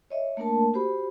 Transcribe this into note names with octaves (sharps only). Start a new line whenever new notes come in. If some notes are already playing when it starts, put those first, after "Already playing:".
C#5 D#5 E5
A3 A#3 D4 A#4 A5
F#4 G4 C5 B5